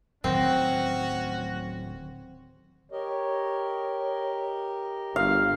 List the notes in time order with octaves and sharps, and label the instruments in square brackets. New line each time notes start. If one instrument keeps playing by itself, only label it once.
[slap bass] D1 D#3 F#3 [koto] C4 [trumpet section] C#4 F#4
[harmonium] G4 A#4 D#5 [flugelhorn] C#5
[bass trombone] G1 [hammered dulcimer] F5